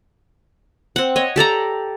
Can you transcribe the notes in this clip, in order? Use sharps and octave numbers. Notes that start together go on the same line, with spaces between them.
C4 F#5
C#5 D#5
G4 A4 D5 A#5